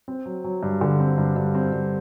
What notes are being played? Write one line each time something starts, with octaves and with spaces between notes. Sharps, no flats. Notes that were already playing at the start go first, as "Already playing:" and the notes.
C4
F#3
F#3
G2
D3
C4
G2
G2
C4
G2